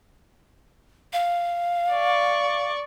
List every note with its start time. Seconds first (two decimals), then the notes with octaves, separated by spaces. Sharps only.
1.13 F5
1.93 D5 C#6